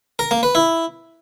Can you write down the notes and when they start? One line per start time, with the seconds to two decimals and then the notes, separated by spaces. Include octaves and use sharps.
0.19 A#4
0.31 A#3
0.43 B4
0.55 E4